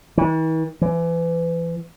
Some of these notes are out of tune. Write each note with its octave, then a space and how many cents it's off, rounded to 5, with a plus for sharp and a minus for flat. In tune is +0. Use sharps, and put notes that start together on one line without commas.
E3 -45
E3 +30